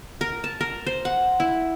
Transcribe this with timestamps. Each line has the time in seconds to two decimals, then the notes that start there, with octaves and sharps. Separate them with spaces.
0.21 A#4
0.44 A5
0.61 A#4
0.86 C5
1.05 F#5
1.40 E4